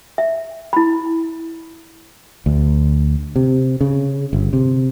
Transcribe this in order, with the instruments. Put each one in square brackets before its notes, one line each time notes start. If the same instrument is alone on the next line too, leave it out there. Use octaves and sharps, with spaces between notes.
[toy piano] E5
E4 B5
[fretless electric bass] D2
C3
C#3
G1
C3